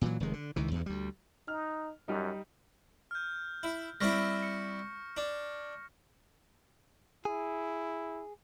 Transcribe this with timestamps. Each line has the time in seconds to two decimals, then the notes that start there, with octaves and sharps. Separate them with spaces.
0.01 A#2 E3 F#3
0.20 F1 D#3 G#3
0.33 D3
0.56 C#2 D#3 E3
0.71 E2 G2
0.86 D2 G3
1.48 D#4 F6
2.08 F#2 G3 D#4
3.11 F6 G6
3.63 E4
4.01 G3 C4 E4 C#6 F6 A#6
4.43 C#7
5.17 D4
7.25 E4 G#4